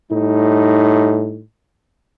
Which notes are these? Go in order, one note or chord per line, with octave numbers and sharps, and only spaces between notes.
A2 G3 D#4